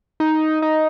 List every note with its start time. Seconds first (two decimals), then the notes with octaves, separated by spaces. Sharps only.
0.20 D#4
0.62 D#4